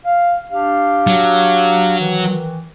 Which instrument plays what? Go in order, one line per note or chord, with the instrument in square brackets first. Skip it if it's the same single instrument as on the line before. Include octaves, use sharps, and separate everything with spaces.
[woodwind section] F5
D4 G4 F5
[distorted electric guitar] F#3
[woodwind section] D#3 E3